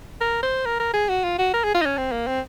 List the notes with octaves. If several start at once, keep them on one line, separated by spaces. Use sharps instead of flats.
A#4
C5
A#4
A#4
G#4
F#4
F4
F#4
A#4
G#4
F4
D#4
C#4
C4
A#3
C4